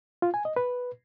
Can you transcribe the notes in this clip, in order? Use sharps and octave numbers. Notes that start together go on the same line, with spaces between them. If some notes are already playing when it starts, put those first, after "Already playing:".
F4
G#5
D#5
B4